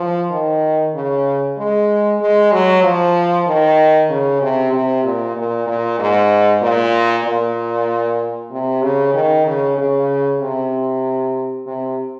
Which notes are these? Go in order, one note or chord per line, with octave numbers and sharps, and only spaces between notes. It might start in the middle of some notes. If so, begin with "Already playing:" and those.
Already playing: F3
D#3
C#3
G#3
G#3
F#3
F3
D#3
C#3
C3
C3
A#2
A#2
A#2
G#2
A#2
A#2
C3
C#3
D#3
C#3
C#3
C3
C3